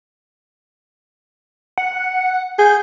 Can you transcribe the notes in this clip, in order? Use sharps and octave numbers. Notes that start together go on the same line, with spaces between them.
F#5
G#4 G6